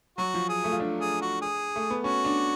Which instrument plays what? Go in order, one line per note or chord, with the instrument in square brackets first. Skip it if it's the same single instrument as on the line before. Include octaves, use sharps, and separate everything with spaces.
[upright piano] F#3 [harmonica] F#4
[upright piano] F3
[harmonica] G#4
[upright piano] A3
F4
D4
[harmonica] G#4
F#4
G#4
[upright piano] A3
B3
[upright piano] C#4 [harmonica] F#4
[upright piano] D4